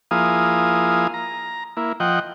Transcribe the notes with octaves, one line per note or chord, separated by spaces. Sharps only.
F3 A#3 E4 G#4 F5 D#6
A#5
A#3 E4
F3 D#5 F#5 G5